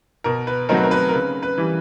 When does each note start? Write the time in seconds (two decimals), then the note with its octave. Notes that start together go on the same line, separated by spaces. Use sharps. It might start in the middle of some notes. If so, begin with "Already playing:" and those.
0.24 B2 A#4
0.47 B4
0.69 F#3 A3 C4 D#4 A#4
0.77 B4
0.84 A#4
0.91 B4
1.09 A#4
1.13 C#3 B4
1.43 B4
1.58 E3 G3